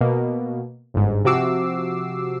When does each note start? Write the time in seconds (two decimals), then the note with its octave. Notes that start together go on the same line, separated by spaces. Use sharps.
0.01 B2 A#3
0.94 G1 G#2
1.25 C3 F3 F#4 D6 E6 C7